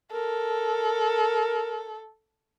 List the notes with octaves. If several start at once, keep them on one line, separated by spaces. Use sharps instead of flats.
A4 A#4